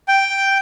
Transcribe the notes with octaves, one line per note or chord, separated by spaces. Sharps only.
G5